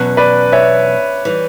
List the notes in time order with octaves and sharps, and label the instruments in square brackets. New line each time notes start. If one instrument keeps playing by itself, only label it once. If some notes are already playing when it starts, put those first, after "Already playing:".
Already playing: [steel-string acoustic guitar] E2 B2 F#3 C#4
[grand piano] B4 D5
C#5 E5
[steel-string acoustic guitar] E3 G3